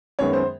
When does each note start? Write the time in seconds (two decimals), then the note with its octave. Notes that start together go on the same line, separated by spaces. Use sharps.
0.19 F#2 D#3 G#3 B3 C#5
0.33 C5